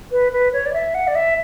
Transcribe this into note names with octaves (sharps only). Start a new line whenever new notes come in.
B4
B4
C#5
D5
E5
F#5
D5
E5